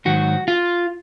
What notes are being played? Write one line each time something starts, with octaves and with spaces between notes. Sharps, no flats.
G#2 D#3 F#3 F#4
F4